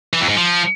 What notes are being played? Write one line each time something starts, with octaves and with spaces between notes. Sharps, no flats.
E3
F2
G#2
F3